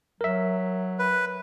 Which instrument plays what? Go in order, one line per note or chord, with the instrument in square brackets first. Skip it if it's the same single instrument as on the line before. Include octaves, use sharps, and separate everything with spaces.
[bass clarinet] F#3 [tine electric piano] A#4 E5
[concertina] B4